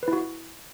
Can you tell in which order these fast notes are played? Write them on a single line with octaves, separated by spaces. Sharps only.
B4 E4 F#4